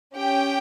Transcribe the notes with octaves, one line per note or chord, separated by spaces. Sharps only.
C#4 G4 G5